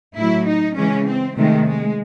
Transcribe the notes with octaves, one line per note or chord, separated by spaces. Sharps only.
A2 F#3 E4
D#4
C#3 E3 G#3 C#4
C4
C3 D#3 G#3 A3
G#3